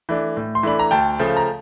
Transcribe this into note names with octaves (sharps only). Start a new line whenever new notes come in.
E3 A3 D4
A2
C6
E3 A3 D4 B5
A#5
D2 G5 A5
C#3 F3 A3
A#5